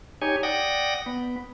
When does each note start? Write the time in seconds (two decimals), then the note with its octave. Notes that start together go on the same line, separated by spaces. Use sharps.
0.22 D#4 G4 C#5 G#5
0.43 D5 F#5 G5 D#6 A#6
1.06 B3